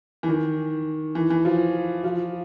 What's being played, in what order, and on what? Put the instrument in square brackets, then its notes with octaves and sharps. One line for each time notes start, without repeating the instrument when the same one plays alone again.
[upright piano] E3
D#3
E3
E3
F3
F3